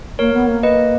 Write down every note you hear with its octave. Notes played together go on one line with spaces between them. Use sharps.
A#3 A#4 C#5
B3
A#3
B4 D#5